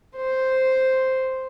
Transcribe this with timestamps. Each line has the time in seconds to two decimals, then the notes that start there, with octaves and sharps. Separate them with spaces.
0.16 C5